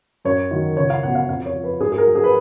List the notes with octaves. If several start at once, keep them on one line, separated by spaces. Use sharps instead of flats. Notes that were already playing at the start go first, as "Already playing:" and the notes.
F#2 C#5
D#3 F#3
C#2 C#5
F5
B2 F#3 F#5
F5
F2 F5
C#5
F3
B4
G#2 G#4
G#4
A#4
F#3
G#4
B4